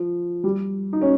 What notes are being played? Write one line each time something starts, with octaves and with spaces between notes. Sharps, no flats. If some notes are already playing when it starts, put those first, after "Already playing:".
Already playing: F3
G3
D#4
C#4